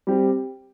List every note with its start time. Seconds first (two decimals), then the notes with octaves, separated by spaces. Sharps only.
0.07 G3 C4 G4